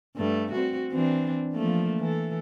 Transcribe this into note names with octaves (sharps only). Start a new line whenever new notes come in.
G2 A3
C4 F#4
E3 C4 D4
F3 A3 A#3
E3 A4